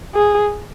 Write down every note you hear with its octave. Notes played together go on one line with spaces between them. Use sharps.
G#4